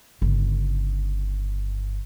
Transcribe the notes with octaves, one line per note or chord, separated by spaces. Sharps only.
G1 C#3